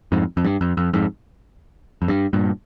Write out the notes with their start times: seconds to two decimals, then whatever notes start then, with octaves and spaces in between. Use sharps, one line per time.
0.12 F2 G#2
0.37 F2
0.44 G2
0.61 F2
0.77 F2
0.93 F2 G#2
2.02 F2
2.08 G2
2.33 G2 A#2